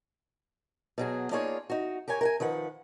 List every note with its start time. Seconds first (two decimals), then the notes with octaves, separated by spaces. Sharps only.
0.98 B2 F#3 G#4
1.31 A#3 D4 D#4 F4 G#4 C#5
1.70 D#4 F#4
2.08 G4 A#4 C#5 G#5
2.21 A#4 F#5 G#5
2.40 D#3 F3 B4 F#5